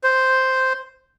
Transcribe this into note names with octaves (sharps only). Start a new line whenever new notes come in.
C5